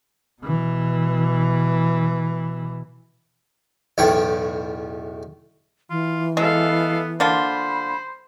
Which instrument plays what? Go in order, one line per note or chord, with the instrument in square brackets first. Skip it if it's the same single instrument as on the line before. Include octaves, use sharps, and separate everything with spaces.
[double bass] B2 E3
[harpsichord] B1 E2 A2 C#4 G5
[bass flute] E3 [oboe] F4
[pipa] G#3 [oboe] B3 [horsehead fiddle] A4 F5
[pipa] D3 A#3 F4 [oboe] C5 [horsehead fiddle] B5